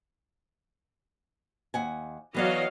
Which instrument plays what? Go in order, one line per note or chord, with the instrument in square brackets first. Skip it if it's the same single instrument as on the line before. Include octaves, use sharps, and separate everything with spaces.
[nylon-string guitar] D#2 F#5 G#5
[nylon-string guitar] E3 B3 D5 [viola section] F#3 D#5 F5